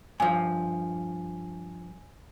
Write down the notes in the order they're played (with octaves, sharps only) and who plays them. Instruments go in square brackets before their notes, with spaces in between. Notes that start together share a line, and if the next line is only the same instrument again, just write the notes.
[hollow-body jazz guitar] G2 F3 [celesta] G#5